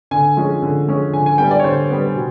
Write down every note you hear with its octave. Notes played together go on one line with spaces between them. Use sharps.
D3 G#5
F3 G#3 C#4
D3
F3 G#3 C#4
D3 G#5
G#5
G3 B3 G5
D5
C#5
D3 C5
G3 B3
B2